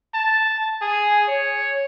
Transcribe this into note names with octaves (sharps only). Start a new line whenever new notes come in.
A5
G#4
C#5